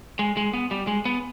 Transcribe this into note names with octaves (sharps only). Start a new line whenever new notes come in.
G#3
G#3
B3
G3
G#3
B3